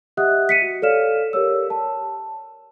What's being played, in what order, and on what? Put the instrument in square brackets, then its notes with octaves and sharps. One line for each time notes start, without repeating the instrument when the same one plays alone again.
[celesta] G4 D#5 E5 F#5 D#6 F#6
B6 C#7 D#7
F#4
A4 C#5 D5 F5 F6 E7
G4 A#4 C#5 E6
A5